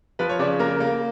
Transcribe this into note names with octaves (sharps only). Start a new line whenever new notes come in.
F3 B4
C#5
C#3 D5
A#3 A#4
A#3